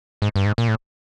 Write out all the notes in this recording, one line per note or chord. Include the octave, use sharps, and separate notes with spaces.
G#2
G2
G#2
A#2
A2